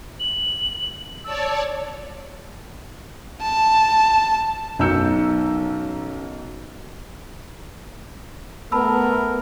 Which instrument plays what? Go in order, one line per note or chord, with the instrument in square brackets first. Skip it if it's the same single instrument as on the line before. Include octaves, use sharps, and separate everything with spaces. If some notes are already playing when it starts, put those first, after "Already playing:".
[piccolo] F#7
[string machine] C#5 D5 A5 [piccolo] E6
[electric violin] A5
[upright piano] B1 F#2 A#5 E6 G6 C#7
[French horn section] A3 B3 [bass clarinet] A#4 [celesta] A5 B5 E6